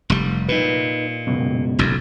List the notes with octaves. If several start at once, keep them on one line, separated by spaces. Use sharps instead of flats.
F1 G3
A#2 D#4 B4
C#2 F#2 B2
F#1 B1 F2